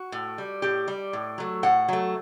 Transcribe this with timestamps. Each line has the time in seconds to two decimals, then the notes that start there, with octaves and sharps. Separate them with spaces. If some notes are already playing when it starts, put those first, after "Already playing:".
Already playing: F#4
0.12 A2
0.38 G3
0.62 A2 G4
0.88 G3
1.13 A2
1.38 F#3 A3
1.63 A2 F#5
1.88 F#3 A3